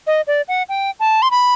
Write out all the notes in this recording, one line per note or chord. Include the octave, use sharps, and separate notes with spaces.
D#5
D5
F#5
G5
A5
C6
B5